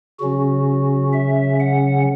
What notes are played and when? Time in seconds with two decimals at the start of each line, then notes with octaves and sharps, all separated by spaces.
0.19 C#3 F#3 C#4 F#4
1.13 E5
1.60 F#5